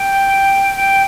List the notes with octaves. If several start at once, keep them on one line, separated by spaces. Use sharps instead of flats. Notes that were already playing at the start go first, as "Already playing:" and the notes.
Already playing: G5
G5